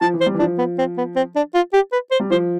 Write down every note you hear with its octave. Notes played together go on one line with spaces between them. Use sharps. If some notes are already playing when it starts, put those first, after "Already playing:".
F3 A5
E3
C5
G3
E3
F3 D4
B3
C4
B3
C4
D4
F4
G4
B4
C5
G3
F3 C5